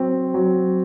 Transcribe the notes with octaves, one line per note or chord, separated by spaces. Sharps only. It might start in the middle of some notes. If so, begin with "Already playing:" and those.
Already playing: F#3 C4
F#3